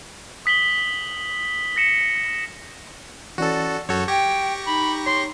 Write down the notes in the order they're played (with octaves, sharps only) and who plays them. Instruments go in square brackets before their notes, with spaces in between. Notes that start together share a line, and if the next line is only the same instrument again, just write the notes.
[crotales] D#6 B6 F#7 G7
A#6 C#7 E7
[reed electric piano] E3 C#4 [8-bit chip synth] F#4 A4 [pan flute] D5
[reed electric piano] F#2 G6 [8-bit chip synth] F#4 A4 C#5
[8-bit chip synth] G4 C#6 A#6 [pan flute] G5 [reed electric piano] G#6
[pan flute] D#4 [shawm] B5
[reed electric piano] C#5 [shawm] C6